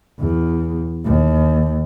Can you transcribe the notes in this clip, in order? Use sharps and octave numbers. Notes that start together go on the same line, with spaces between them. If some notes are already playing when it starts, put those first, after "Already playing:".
E2
D#2